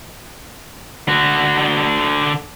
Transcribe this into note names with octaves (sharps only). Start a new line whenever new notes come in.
D3 F#4